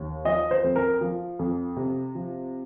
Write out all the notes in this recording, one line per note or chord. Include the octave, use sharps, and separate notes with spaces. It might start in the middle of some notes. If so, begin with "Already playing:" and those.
Already playing: D#2
F3 D#5
C5
F2
A#4
F3
F2
C3
F3